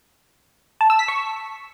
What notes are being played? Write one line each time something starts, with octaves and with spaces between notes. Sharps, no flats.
A5
E6
B6
C#6